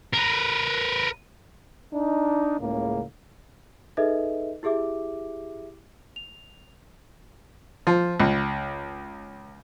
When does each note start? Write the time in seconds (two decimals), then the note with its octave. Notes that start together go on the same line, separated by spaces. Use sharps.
0.13 A#4 B4
1.93 D4 D#4
2.60 C#2 A2 C#3 A#3
3.97 D#4 G#4 A4 B4 D#5 E5
4.63 E4 G4 G#4 E5 D6
6.16 F7
7.87 F3
8.20 C#2